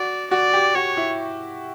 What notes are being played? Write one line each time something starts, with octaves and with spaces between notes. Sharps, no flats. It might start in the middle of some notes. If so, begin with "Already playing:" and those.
Already playing: F#4 D5
F#4 D5
G4
F#4 C#5
E4